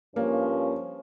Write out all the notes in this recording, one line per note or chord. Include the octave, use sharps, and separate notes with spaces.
G2 F3 A#3 C#4